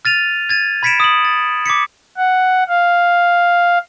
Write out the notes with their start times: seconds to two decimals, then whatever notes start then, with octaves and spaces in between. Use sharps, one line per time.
0.05 F6 A6 D#7 F7
0.49 G#6 A6 D#7
0.83 B5 G#6 B6 C#7 D7 E7
1.00 D#6 B6 F#7
1.25 A6
1.66 D6 G#6 B6 C#7
2.16 F#5
2.68 F5